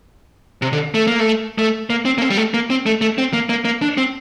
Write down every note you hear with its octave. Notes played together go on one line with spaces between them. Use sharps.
C3
D3
A3
A#3
A3
A3
A#3
C4
A#3
C4
G3
A3
A#3
C4
A3
A3
C4
A#3
A#3
A#3
D4
C4